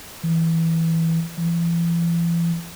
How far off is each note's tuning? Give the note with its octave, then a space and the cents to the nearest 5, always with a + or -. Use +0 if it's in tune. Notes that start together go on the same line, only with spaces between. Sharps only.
E3 -10
E3 +40